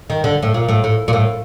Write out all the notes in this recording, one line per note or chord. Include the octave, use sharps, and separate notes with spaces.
D#3
D3
A2
A#2
A2
A2
A#2
A2